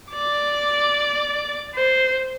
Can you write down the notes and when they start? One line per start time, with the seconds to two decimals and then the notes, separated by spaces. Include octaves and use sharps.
0.12 D5 D6
1.76 C5